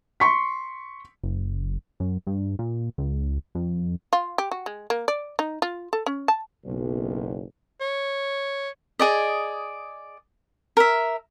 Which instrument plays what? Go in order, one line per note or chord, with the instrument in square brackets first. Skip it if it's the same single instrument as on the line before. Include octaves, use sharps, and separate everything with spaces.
[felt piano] C6 C#6 B6
[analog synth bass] F#1
F#2
G2
A#2
C#2
F2
[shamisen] F4
G4
F#4
G#3
A#3
D5
D#4
F4
A4
C#4
A5
[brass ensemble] F#1 B1
[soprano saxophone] C#5
[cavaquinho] G#4 D5 D#5
A#4 E5